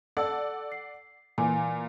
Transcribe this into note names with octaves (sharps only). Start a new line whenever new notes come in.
A4 D5 F#5 A5 E6
C7
A#2 E3 G#5 D6